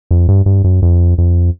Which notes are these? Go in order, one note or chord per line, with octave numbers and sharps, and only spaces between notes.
F2
G2
G2
F#2
F2
F2